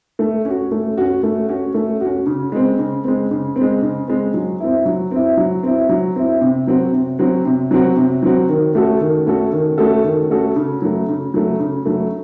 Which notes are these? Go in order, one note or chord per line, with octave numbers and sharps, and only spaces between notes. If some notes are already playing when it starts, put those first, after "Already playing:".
A3
C#4 F#4
A3
C#4 F#4
A3
C#4 F#4
A3
C#4 F#4
C#3
G#3 C4
C#3
G#3 C4
C#3
C4
G#3
C#3
G#3 C4
F#3
C4 E4
F#3
C4 E4
F#3
C4 E4
F#3
C4 E4
C3
F#3 C4 F#4
C3
F#3 C4 F#4
C3
F#3 C4 F#4
C3
F#3 C4 F#4
D#3
A3 C#4 F#4 A4
D#3
A3 C#4 F#4 A4
D#3
A3 C#4 F#4 A4
D#3
A3 C#4 F#4 A4
C#3
F#3 A3
C#3
F#3 A3
C#3
F#3 A3